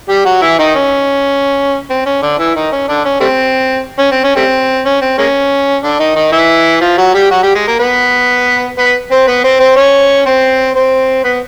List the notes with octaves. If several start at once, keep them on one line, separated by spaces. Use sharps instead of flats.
G3 G4
F#3 F#4
E3 E4
D#3 D#4
C#4
C4
C#4
D3 D4
E3 E4
D#3 D#4
C#4
D3 D4
C#4
G3 A3 C4
C#4
C4
C#4
G3 A3 C4
C#4
C4
G#3 A#3 C#4
D3 D4
D#3 D#4
D#3 D#4
E3 E4
F3 F4
F#3 F#4
G3 G4
F#3 F#4
G3 G4
G#3 G#4
A#3 A#4
B3 B4
B3 B4
C4 C5
B3 B4
C4 C5
C4 C5
C#4 C#5
C4 C5
C4 C5
B3 B4